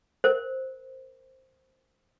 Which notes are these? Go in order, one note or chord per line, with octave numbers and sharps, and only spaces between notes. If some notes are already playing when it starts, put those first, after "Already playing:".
A#4 C5